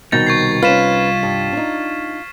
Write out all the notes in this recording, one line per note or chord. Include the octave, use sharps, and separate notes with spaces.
C2 B2 D#3 D#4 G5 A6
C#6 G#6 C7
C#4 F4 B4 F6 B6 E7
G2
D4 D#4